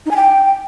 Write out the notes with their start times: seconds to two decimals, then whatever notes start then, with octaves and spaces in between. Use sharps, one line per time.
0.06 D#4
0.11 G#5
0.16 G5